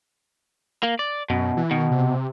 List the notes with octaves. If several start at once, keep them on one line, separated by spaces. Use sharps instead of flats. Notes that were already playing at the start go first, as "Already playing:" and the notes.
A#3
D5
F#2 B2
E3
B2 D#3
C3